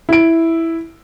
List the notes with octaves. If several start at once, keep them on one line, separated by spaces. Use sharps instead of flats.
E4 D7